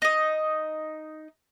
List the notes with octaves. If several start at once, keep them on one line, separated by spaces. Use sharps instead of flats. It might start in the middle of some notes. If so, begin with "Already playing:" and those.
D#4 D#5